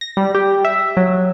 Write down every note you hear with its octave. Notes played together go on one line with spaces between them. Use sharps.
A#6
G3
G4
E5
F#3